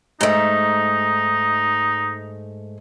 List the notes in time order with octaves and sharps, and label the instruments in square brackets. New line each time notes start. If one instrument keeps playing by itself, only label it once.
[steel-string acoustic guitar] G#2 A3 [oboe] D#4